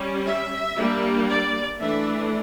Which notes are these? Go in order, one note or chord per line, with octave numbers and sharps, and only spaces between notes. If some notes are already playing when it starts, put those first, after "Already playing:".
Already playing: G3 C#4
E5
G3 A#3 D4
D5
E3 A3 D4 E5